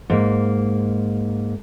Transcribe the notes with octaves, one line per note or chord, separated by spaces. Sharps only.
G#2 A#3